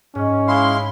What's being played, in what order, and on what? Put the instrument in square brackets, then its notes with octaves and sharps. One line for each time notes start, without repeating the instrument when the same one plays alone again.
[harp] G#2 [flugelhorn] C#4
[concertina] G#3 E4 F5 [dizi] C6